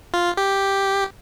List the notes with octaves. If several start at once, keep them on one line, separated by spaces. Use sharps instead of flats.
F4
G4